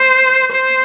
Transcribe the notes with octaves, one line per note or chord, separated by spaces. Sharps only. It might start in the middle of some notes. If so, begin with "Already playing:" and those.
Already playing: C5
C5